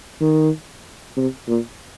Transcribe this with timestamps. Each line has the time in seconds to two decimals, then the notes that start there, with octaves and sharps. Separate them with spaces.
0.21 D#3
1.17 C3
1.48 A#2